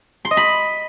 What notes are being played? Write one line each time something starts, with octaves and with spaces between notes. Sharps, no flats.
C6
D#5
B5